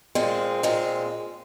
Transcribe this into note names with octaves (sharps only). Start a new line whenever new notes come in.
A#2 G#3 C4
A#2 G#3